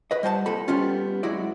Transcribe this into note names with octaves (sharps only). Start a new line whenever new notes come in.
B4 D#5
G3 C5 F#5 G#5 A5
C2 A#2 A4 B5
G3 B3 C#4 F4
C2 F#3 G#3 E4 F#4 D5